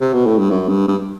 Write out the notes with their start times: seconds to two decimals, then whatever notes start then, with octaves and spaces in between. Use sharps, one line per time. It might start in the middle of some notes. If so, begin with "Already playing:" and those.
0.01 C3
0.13 B2
0.26 A2
0.38 G2
0.51 F#2
0.68 G2
0.88 G2